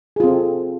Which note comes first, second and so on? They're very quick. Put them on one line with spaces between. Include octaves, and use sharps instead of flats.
G#4 F4 C4 A4